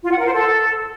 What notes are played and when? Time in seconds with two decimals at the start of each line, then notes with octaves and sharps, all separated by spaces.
0.03 F4
0.10 F#5
0.18 A#4
0.25 C5
0.33 A4